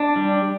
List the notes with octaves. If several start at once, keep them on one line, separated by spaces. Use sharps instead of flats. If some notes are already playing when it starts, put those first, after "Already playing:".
Already playing: D4
G3